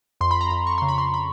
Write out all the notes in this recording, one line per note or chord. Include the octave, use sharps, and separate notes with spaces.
F2 C6
B5
A#5
F2 B5
C#6
C#3 C6
B5
C6
B5